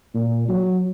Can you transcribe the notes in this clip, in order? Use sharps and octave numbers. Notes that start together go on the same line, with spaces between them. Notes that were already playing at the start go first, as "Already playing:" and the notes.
A#2
F#3